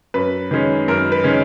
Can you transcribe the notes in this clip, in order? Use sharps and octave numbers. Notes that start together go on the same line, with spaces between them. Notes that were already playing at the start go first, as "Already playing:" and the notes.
F#2 B4
D#3 G#3 C#4
F#2 A#4
B4
D#3 G#3 C#4